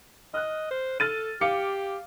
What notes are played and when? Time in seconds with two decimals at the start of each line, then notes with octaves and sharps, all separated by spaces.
0.34 D#5 F6 F#6
0.71 C5
1.00 A4 F6 A6 D#7
1.41 G4 F5 D6 C#7